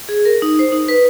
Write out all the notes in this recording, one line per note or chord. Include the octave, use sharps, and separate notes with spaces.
G#4
A#4
D#4
C5
D#4
B4